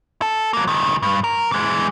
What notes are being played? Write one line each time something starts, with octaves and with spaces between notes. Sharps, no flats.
A4
F#3 A#3
C#2 D#3
G2
A#4
E3 G#3